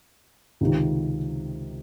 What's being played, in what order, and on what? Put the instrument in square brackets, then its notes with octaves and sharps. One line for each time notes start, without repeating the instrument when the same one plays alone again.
[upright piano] C#2 C3 D#3